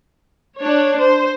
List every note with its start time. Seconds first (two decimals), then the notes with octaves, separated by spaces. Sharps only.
0.58 D4 C#5
1.00 C5